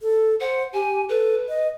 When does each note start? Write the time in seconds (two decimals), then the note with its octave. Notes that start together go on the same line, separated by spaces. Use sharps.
0.01 A4
0.40 C5 F#5
0.74 G4 G#5
1.09 A4 B4
1.49 D#5